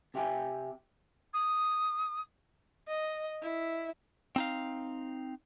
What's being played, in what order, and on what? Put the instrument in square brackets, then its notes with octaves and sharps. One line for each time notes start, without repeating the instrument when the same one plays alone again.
[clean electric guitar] C3 G4 E5 G5 G#5
[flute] D#6
[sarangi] D#5
E4
[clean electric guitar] C4 D#4 F5